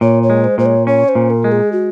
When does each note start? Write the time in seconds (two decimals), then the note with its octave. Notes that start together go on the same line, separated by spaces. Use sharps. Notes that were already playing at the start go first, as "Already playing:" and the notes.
0.01 A#2 C#5
0.23 C#5
0.30 G#3
0.44 C5
0.58 A#2 C5
0.66 C#5
0.87 C#4 C#5
1.08 C5
1.15 A#2
1.30 A#4
1.44 G#3
1.52 G#4
1.72 F#4